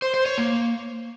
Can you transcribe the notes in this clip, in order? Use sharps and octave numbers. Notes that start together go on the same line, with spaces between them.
C5
C5
C#5
A#3